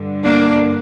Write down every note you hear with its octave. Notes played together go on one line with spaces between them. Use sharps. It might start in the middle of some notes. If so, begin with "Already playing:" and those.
Already playing: G2 D3
A#3 D4